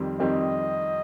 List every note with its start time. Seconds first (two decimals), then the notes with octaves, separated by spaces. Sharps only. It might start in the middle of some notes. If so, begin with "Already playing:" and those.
Already playing: F2 D#3 G3 C4 G4
0.19 F2 D#3 G3 C4 G4 D#5